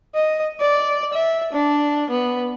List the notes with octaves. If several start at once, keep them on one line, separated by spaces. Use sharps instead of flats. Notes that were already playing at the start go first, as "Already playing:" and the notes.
D#5
D5
E5
D4
B3